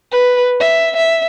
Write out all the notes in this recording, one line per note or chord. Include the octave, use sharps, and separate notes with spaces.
B4
E5
E5